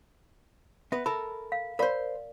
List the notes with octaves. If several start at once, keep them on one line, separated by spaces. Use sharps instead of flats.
B3 B4 E5
A4 A#4 B5
F5
A#4 C5 D5 F5 B5